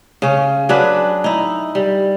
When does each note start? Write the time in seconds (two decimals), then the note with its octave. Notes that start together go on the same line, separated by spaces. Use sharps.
0.22 C#3 C#4
0.69 F#3 D4 G#4 B4
1.24 D#4 E4
1.75 G3